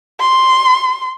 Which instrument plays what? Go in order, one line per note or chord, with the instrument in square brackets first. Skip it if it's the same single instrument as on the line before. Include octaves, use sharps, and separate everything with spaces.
[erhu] C6